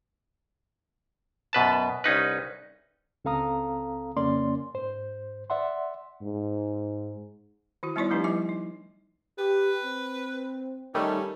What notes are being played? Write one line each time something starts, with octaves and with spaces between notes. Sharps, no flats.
F#2 B2 B4 A5
C2 C#4 D#4 B4
C#2 C4 A4 F5 A#5 D#6
F2 C#3 A#3 C#4 D5 C6
G#2 C5
D5 E5 F#5 C6
G#2
D#3 E4 F#4
G3 B3 D#4 E4 C#5 D5
F3 A3 D4 D#4 G4 B4
F3 G3 E4 C#5 G#5 D6
D#4
G4 B4
C4
D#3 G3 A3 C#4 D#4